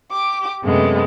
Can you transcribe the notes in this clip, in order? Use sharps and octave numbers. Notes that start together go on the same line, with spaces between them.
G4 D6
F#2 C3 G#3 A3 B3